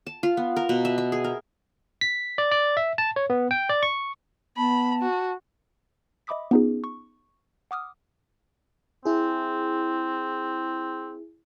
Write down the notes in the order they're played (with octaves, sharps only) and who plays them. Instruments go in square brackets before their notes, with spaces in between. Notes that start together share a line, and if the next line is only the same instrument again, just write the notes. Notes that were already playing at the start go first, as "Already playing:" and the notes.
[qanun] A5
F4
B3
A#4
B2
E5
E5
G#4
A#4
[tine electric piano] B6
D5
D5
E5
A5
C#5
B3
G5
D5
C#6
[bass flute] B3 [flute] A5 [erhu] B5
[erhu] F#4
[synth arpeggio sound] D#5 E5 B5 D6 D#6 B6
B3 C#4 D#4 F4 G#4
C#6
F#5 D6 D#6 F6
[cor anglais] C4 [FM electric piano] E4 G#4